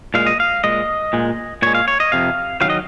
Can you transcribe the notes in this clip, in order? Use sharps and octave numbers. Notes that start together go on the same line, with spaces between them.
A#2 G#3 F5
D#5
F5
A#2 G#3 D#5
A#2 G#3
A#2 G#3 C#5
F5
C#5
D#5
F2 C3 F5
C3 D#3 F#3 F5
D#5